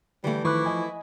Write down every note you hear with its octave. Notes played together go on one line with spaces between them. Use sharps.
D3 E3 G3 A3
D#3 F3 E4 B4 C#6 D6 F#6
D#5 G#5